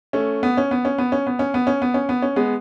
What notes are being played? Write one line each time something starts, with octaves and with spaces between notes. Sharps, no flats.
A3 C#4
B3
C#4
B3
C#4
B3
C#4
B3
C#4
B3
C#4
B3
C#4
B3
C#4
G#3 B3